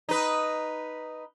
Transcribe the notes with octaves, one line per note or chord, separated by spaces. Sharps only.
D#4 B4